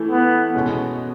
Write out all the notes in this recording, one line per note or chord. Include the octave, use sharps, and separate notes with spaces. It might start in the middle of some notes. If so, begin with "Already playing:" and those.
Already playing: E3 A3 E4
B3
B2 G#3 C#4